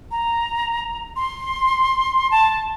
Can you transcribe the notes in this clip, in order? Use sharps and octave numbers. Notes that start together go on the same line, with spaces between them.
A#5
C6
A5